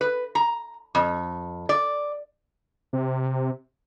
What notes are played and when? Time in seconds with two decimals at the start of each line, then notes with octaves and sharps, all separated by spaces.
0.01 B4
0.35 A#5
0.95 F2
1.69 D5
2.93 C3